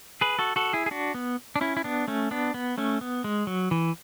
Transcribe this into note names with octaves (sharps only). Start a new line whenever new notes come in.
G#4 B4
F#4 A4
F#4 A4
E4 G#4
G#4
D4 F#4
B3
D4
C#4 E4
E4
B3 D4
A3 C#4
B3 D4
B3
A3 C#4
B3
G#3
F#3
E3